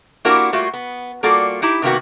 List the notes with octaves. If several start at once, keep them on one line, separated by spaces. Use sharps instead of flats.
A#3 D4 E4 F#4 G4 A#4
G3 A3 A#3 F4 F#4
B3
G3 A#3 F4 F#4 A4 D5
D#4 E4 G4
C3 D#3 A#3 B3 F#4